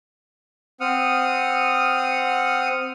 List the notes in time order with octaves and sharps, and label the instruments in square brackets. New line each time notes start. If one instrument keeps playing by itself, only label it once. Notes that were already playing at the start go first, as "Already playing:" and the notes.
[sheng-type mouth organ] C4 F#5 D#6 F6